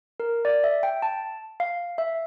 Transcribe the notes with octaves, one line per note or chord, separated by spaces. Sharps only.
A#4
D5
E5
G5
A5
F5
E5